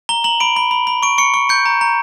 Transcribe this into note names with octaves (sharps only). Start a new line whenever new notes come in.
A#5 G7
A#5 F#7
B5 D7
B5
B5
B5
C#6 D7
C#6 C#7
C#6
G6 C#7
A#5
A#5